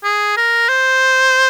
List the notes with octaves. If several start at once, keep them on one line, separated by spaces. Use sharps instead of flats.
G#4
A#4
C5